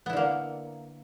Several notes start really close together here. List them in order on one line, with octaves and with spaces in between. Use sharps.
B3 E4 D3 A#3